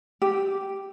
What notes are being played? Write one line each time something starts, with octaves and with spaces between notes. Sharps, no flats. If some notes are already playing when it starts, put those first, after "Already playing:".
G4